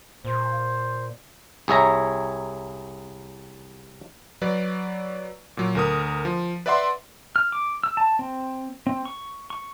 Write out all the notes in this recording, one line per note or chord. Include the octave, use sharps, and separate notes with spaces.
A#2 C5
C2 G#4 C#5 E5 A#5
F#3 B4 D5
A#2 F#3
D2 A#4 D#6
F3
B4 D5 E5 F#5 C6
F6
D6
E6
A5
C4
C4
C#6
C#6